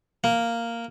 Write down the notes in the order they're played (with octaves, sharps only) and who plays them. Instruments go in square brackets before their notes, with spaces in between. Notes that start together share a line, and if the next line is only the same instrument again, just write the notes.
[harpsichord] A#3